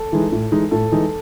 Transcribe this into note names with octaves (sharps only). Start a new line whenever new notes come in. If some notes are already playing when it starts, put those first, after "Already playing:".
Already playing: A4
E3 G#3 D#4
A2
E3 G#3 D#4
A2 A4
E3 G#3 D#4